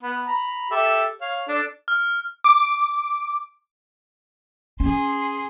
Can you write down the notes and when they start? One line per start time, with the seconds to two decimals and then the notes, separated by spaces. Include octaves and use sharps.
0.03 B3 B5
0.27 A#5 B5
0.71 G4 A4 E5
1.21 C#5 F5
1.48 D4 A4
1.88 F6
2.44 D6
4.80 C#4 G#4 C6